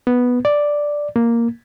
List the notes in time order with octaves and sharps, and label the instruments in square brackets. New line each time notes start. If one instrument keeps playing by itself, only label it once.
[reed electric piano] B3
D5
A#3